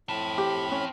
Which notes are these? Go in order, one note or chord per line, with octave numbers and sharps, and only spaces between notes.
A2 C4 A5 B5
G4
C#4